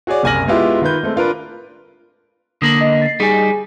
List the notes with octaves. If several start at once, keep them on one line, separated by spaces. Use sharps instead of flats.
F#4 G#4 C#5 D5
F#1 C2 G#5 F6 A#6 F#7
G#3 B3 E4 F4 G4 E5
D#3 F4 B4 G6
G#3 A3 C4
D4 F4 A#4 B4
D3 A#3 D#6 A#6 F#7
D#5
A6 C7
G3 D#4 G#4 G#5